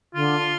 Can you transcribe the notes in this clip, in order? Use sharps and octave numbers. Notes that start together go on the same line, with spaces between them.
D3 F4